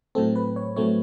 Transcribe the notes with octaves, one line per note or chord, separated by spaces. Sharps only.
A2 F#3 A3 C4 A4
B4
C#5
A2 F#3 A3 C4 C#5